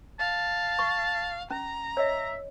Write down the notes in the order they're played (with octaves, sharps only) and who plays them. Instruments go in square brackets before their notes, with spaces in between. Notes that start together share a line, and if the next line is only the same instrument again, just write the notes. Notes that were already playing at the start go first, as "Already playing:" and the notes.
[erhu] F5 [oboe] A5
[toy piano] C#6
[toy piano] C#4 [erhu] A#5
[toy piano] C#5 D#5 [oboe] E5